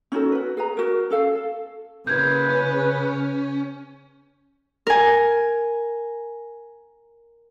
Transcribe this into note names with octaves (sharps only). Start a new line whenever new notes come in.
C#4 D#4 F#4 A4
F#4 B4
G#4 B4 A#5
F#4 A#4
C#4 A4 F5
A4
C#3 A#3 E4 B4 G6 G#6
C#4
A#4 G#5